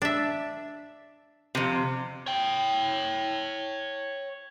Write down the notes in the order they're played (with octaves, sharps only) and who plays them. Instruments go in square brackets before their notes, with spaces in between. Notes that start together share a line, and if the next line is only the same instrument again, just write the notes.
[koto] D4 E5
[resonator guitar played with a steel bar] F2 C3
[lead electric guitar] C#5 G5